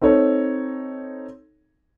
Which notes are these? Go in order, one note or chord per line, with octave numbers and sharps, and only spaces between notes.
C4 D#4 A4 C#5